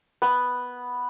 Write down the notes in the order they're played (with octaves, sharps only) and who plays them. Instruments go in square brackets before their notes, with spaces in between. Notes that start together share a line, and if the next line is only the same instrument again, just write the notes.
[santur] B3